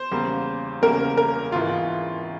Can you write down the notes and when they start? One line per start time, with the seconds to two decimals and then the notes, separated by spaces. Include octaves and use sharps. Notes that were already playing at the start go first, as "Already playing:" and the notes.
Already playing: C5
0.12 E2 C#3 G3 A#3
0.82 E2 C#3 G3 A#3 A#4
1.17 A#4
1.52 G#1 G#2 E3 F4